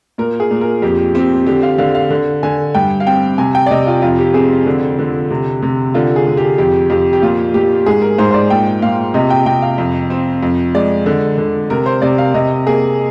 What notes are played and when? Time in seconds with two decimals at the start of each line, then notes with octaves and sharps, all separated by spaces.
0.18 A#2 A#4
0.40 G#4
0.51 A#2
0.61 A#4
0.82 F2 G4
1.15 C4 G4
1.46 D3 G4
1.63 F5
1.78 D3 F5
1.95 F5
2.10 D3
2.43 D3 G#5
2.74 G2 G5
3.00 F5
3.06 C4 G5
3.38 C3 G#5
3.55 G5
3.66 D5
3.71 C3 D#5
3.87 F4
4.02 F2 F4
4.19 G4
4.34 C4 G#4
4.66 D3
4.99 D3
5.30 C3
5.62 C3
5.94 D3 F4
6.16 G#4
6.27 D3
6.37 G4
6.58 F2 G4
6.90 F2 G4
7.13 G4
7.22 A#2 F4
7.54 A#2 G4
7.86 G#2 G#4
8.02 A#4
8.18 G#2 C5
8.31 C5
8.34 D5
8.50 A#2 G5
8.82 A#2 F5
9.14 C3 D#5
9.30 G5
9.46 C3 G5
9.62 F5
9.78 F2
10.10 C4
10.43 F2
10.74 G#3 D5
11.06 D3
11.38 D3
11.70 C3 A#4
11.86 C5
12.02 C3 D5
12.18 F5
12.34 C3 D#5
12.67 A#3 G#4